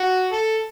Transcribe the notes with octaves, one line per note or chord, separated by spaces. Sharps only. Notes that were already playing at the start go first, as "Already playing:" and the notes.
Already playing: F#4
A4